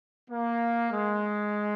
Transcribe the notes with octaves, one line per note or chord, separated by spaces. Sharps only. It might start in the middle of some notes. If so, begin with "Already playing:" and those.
A#3
G#3